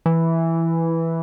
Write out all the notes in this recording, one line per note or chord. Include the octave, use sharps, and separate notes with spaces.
E3